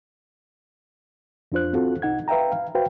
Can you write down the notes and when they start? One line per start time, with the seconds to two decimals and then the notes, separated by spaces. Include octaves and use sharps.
1.52 F2 D4 F4 C5 F#6
1.73 C4 F4 F#4 A4
2.02 C2 D#4 F#5 G#6
2.28 B4 E5 F5 G5 A#5
2.52 F5
2.75 F#4 B4 C5 F5 G5